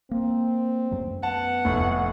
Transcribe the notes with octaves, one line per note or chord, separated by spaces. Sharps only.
A#3 C4
F#2 F#3 A3
B3 F#5 A5
F1 A2